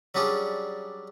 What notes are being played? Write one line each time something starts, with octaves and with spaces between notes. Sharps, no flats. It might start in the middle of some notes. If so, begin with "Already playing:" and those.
F#3 G3 C#4 D4 G#4